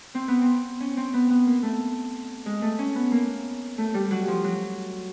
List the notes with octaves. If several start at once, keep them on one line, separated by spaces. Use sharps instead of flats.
C4
B3
C4
C#4
C4
B3
B3
A#3
A3
G#3
A3
C#4
B3
A#3
A3
G3
F#3
F3
F#3